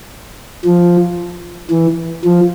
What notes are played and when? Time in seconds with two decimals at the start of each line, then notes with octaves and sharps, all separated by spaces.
0.65 F3
1.71 E3
2.24 F3